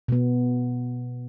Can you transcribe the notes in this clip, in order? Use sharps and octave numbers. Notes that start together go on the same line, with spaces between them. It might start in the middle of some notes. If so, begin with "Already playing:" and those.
B2 B3